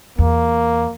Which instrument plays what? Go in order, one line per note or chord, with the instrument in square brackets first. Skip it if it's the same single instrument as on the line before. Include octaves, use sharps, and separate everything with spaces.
[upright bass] E2 [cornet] A#3